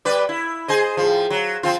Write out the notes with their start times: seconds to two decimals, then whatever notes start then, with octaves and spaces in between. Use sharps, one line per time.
0.05 G3 B4 D5
0.29 E4
0.68 G#4 C5 D#5
0.97 A2 F3
1.30 F#3
1.63 F3 C4 F4